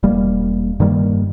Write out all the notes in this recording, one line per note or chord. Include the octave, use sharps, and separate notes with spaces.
E1 G3 A#3
G2 D#3 G3 A#3